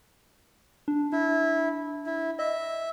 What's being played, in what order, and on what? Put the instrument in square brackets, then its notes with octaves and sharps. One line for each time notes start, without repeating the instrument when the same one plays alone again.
[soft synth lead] D4
[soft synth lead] D4 [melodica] E4
[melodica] E4
[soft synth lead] D#5 [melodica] E5